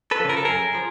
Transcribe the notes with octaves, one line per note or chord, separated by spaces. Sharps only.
A4 B4
C#3 F3
A#4
A4
F#2 G#4 A#4
F3